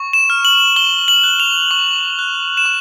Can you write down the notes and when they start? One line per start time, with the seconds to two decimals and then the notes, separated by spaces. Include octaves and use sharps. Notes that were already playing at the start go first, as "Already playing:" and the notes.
Already playing: C#6
0.13 E7
0.30 F6
0.45 F#7
0.76 C#6 G7
1.08 F#7
1.24 F#6
1.40 F7
1.71 C#6
2.19 F#6
2.57 E7
2.65 C#6